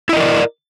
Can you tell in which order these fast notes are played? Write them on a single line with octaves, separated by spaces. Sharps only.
E4 D#5 A#4 D5